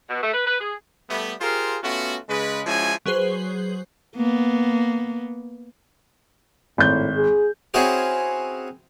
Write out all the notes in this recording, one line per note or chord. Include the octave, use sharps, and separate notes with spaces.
B2
A3
B4
B4
G#4
G3 A3 B3
F4 G4 G#4 A#4 C5 F5
A3 B3 C#4 F4 F#4
C#3 G#3 B4
F3 G#3 C#4 E4 F#4 G#5
F#3 G#4 B4 C5 C7 F#7
A#3 B3
G#1 A2 G6
G#4
C4 C#4 E4 F#4 G#4 C5